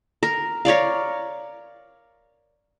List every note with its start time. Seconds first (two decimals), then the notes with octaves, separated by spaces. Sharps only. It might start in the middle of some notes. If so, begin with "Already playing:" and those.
0.23 A#4
0.65 A#4 C#5 D5 F5